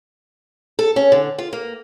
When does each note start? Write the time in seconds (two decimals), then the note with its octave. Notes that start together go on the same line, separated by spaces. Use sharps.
0.79 A4
0.96 C#4
1.12 D3
1.38 F4
1.53 A#3